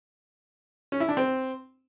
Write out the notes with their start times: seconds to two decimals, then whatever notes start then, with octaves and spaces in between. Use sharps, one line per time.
0.92 C#4
1.00 E4
1.09 D4
1.17 C4